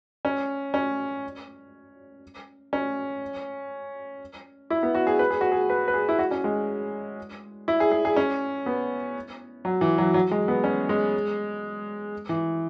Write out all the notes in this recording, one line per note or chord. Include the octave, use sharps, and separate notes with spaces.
C#4
C#4
C#4
E4
B3
F#4
G#4
B4
G#4
F#4
G#4
B4
B4
G#4
E4
F#4
C#4
G#3
E4
G#4
G#4
G#4
C#4
B3
F#3
E3
F#3
F#3
G#3
B3
C#4
G#3
E3